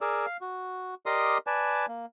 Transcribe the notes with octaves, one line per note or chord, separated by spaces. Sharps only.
G#4 A#4 D5 E6
F5
F#4
G4 A#4 D5 D#5 C6 D#6
B4 D5 G#5 A5
A#3